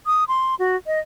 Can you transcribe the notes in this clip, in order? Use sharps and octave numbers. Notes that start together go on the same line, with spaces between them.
D#6
C6
F#4
D#5